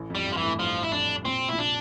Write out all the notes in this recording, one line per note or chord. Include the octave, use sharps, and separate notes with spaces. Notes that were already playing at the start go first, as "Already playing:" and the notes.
Already playing: A1 A2
F2 G3
G2
F3
E3
A1 A2
G2 F3
E4
F2 D4
G2
A#2 C4
C3
A#1 A#2 E4
D4